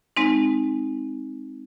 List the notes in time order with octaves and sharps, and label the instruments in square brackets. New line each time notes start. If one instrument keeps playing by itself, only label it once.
[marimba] G#3 C4 D#4